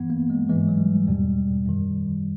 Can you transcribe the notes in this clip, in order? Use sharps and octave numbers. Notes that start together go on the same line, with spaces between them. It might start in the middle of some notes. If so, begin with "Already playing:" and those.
Already playing: G2 E3 B3
A#3
G#3
G#2 E3 G#3
F#3
G3
E2 B2 G3
F#2 D#3